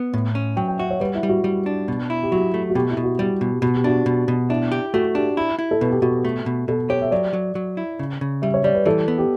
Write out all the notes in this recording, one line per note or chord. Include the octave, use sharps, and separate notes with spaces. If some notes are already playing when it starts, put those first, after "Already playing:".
Already playing: B3
A2
C#4
F#3 G5
G5
F#4 E5
C#5
G3 B4
E4
G3
F#4
G3
D4
B2
E4
G4
F#3 F#4
A3
F#4
B2 G4
E4
B2
F#4
G3 G4
B2
B2 F#4
G4
D4 F#4
B2
B2
D4 E4
G4
A3 F#4
D4 G4
E4
E4
A4
B2 B4
G4
B2 F#4
A3
B2
B2 A4
G4 C#5
E5
F#3 D5
F#3
F#3
E4
C#3
C#3
G3 E5
C#5
G3 D5
B4
E3 A4
B3
G4